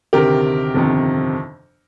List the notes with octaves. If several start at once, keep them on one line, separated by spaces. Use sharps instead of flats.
D2 C3 D#3 G4 A#4
G1 F2 C3 D#3